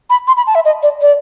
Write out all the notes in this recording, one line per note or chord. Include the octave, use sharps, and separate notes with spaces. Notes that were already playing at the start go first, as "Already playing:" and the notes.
B5
C6
B5
A5
E5
D#5
D5
D5